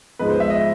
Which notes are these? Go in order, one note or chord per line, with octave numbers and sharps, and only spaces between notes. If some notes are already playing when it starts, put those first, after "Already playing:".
G#2 F3 G#3 B3 B4
C5
E5
D#5